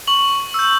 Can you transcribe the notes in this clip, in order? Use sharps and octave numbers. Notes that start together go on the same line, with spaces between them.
C#6 F#7
E6 G6